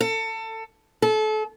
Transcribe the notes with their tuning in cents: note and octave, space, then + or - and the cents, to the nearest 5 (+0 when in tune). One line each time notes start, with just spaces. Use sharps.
A4 +25
A4 -30